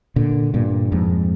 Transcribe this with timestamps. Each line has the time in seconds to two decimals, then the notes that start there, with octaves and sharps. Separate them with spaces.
0.16 A#2 D3
0.54 G2 A#2
0.92 F2 G#2